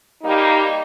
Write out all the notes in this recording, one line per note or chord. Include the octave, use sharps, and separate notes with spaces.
G3 A#3 D#4 G4